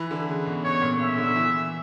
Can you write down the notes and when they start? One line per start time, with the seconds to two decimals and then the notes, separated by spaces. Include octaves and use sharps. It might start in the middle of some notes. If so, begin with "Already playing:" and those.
Already playing: E3 B4
0.11 D3
0.29 C#3
0.46 B2
0.64 B2 C#5
0.82 A#2
1.00 B2 E5
1.18 D3
1.36 E3